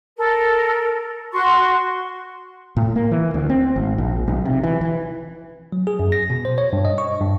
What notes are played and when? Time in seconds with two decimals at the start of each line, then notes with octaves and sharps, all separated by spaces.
0.17 A4 A#4
1.32 F#4 C6 C#6
2.77 A2
2.96 A#3
3.11 E3
3.34 D2
3.50 C4
3.76 G#1
3.98 A#1
4.28 B1
4.45 C3
4.63 E3
4.81 E3
5.72 F#3
5.87 G#4
5.99 F#2
6.12 A#6
6.30 B2
6.45 C5
6.58 C#5
6.73 G2
6.85 D#5
6.98 C#6
7.20 G2